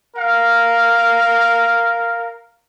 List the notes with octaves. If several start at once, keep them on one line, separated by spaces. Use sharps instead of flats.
A#4 F5